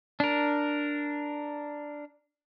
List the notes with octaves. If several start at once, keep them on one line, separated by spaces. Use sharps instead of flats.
D4 A#4